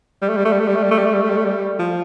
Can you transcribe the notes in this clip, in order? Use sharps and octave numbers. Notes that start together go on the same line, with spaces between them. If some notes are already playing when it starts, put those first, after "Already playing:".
G3
A3
G3
A3
G3
A3
G3
A3
G3
A3
G3
A3
G3
A3
G3
A3
G3
F3